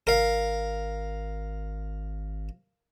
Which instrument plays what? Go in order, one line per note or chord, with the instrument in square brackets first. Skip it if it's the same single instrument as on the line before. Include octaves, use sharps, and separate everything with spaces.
[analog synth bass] G#1 [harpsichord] A#4 F5